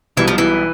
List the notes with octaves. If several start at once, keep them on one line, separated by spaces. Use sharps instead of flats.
B1 B2 E3 G3
F3
E3